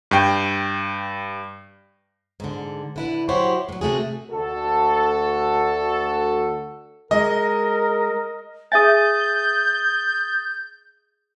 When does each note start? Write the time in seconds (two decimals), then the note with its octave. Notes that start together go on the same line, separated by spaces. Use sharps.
0.11 G2 G5
2.40 G#2 D3
2.96 D3 E4 B4
3.29 F#3 E4 F#4 G4 C5 C#5
3.69 A2 F#3
3.81 C3 A3 F#4 G#4
4.32 D2 F#4 A4
7.11 G#3 A#4 D#5
8.72 G#4 E5 G#5 D#6 G6 A6